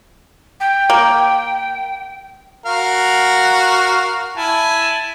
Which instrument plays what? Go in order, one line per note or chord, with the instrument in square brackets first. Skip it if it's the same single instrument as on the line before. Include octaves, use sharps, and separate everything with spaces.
[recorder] G5
[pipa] A#3
[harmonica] F#4 A#4 F5
E4 G#5 A5